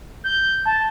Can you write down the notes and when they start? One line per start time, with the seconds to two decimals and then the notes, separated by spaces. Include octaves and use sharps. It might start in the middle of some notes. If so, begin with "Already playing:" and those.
0.24 G6
0.66 A5